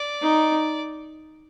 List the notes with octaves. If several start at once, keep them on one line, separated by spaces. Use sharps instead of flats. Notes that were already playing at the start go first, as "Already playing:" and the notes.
Already playing: D5
D#4